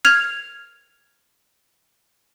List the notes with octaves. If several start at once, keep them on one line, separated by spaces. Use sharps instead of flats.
F6 G#6 F7